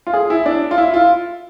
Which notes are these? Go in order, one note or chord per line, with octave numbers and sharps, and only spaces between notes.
F4
G#4
E4
D4
F4
E4
F4